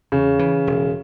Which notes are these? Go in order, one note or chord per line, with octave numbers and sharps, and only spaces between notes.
E2 C#3
E3
E1